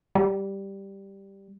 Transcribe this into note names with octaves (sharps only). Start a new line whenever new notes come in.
G3